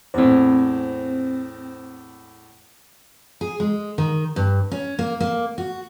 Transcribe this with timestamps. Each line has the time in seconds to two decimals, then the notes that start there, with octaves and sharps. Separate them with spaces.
0.14 E2 A2 C4 C5
3.41 G#4
3.60 G#3
3.98 D#3
4.36 G2
4.71 C#4
4.99 A#3
5.20 A#3
5.58 F#4